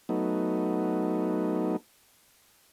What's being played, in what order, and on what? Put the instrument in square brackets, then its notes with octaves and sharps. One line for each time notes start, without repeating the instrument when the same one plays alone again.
[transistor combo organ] F#3 A3 B3 D#4